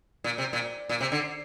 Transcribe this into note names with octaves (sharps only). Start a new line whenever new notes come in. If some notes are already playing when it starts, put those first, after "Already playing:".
A#2
C3
A#2
A#2
C3
D3